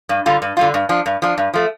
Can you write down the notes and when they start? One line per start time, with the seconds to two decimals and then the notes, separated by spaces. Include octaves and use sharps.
0.09 G2
0.26 D3 G3 F4
0.42 G2
0.57 D3 G3 F4
0.74 G2
0.89 F3 D4
1.06 G2
1.22 F3 D4
1.38 G2
1.54 F3 A3